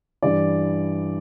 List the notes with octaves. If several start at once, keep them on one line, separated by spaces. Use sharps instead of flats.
G2 E3 G3 D5